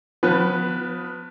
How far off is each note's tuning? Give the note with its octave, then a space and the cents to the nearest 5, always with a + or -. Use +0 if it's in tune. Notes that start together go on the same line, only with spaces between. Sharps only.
F3 +35 B3 +15 B4 +0